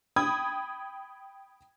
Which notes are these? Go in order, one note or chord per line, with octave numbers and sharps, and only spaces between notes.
G5 B5 D#6 G#6